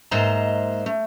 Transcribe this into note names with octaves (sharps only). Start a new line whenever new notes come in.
G#2 A#3 C5 D#5 E5 A#5
A3